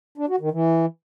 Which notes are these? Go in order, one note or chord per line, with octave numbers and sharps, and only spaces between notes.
D4
F#4
D#3
E3